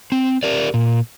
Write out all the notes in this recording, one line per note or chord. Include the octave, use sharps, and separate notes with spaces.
C4
G4 A#4 D5
A#2